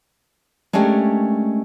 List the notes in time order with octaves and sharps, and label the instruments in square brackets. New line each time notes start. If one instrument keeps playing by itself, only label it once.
[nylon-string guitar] G#3 A3 C#4 D4 G4 A#4